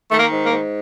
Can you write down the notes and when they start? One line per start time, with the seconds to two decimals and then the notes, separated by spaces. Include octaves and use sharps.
0.11 D#3 A3
0.18 A#3
0.32 G#2
0.45 A#3
0.52 G#2